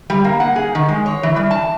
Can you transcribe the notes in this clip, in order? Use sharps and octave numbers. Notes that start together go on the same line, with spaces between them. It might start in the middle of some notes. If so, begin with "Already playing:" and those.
G3
A#3
F#5
G#4
D#3
G#3
C#5
E3
G3
A5